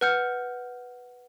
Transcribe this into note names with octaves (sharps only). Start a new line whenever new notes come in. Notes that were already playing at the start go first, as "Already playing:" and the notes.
B4 F#5 F6 G6 C#7